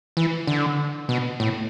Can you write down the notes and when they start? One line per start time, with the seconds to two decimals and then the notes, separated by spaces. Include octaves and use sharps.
0.17 E3
0.47 D3
1.09 B2
1.40 A2